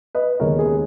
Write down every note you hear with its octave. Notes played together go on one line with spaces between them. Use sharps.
B4 D#5
D#2 C#3 G#3 B3 A#4 C#5
G#4